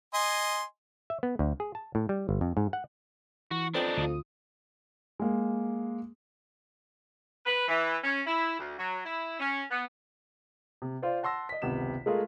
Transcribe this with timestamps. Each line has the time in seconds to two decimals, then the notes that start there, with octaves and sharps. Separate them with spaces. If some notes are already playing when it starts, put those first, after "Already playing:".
0.14 D#5 G#5 C6
1.10 E5
1.23 B3
1.39 D2
1.60 G#4
1.75 A5
1.95 A2
2.09 G3
2.29 G1
2.41 F2
2.57 G#2
2.73 F#5
3.51 E3 F#4
3.74 F2 D4 D#4 B4 D5 G5
3.97 D2 F4 D#6
5.20 G#3 A#3
7.46 B4
7.68 E3
8.04 C#4
8.26 E4
8.59 D2
8.78 F#3
9.06 E4
9.40 C#4
9.71 B3
10.82 C3
11.02 F4 C5 D5
11.23 F#5 A5 C6 E6 A#6
11.49 D#5 B6
11.62 G#1 C#2 C3 B3 E7
12.06 G#3 A3 F4 G#4 A#4